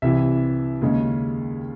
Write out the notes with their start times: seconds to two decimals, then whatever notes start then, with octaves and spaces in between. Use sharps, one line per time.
0.02 C2 C3 E3 E5
0.82 D#2 C#3 G#3 C#4